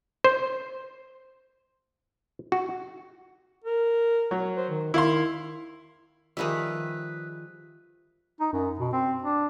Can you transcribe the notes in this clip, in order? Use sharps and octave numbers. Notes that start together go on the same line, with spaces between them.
C5
F#4
A#4
F#3
C5
D#3
D#3 E4 F5 C6
D#3 F3 G3 G#4 B4 E5
D#4
F#2
B2
C4
D4